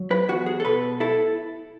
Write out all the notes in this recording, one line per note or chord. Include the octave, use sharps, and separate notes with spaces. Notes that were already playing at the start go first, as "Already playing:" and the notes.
Already playing: F#3
B4
E2 F#4
G#4
A4
B2 B4
E4 A4